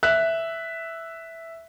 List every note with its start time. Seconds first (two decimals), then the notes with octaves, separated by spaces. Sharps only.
0.03 E5 F#6